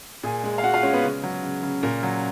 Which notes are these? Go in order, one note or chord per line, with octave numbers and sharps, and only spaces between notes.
A#2 G#4 G#5
G#3
F5
G#3 F#4 F#5
F4 F5
G#3 C#4 C#5
B3 B4
C#3
F#3
C#3
C#3
A#2 A#4
F#3